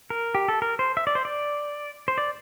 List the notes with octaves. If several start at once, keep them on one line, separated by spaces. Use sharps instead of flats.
A#4
G4
A4
A#4
C5
E5
D5
C5
D5
C5
D5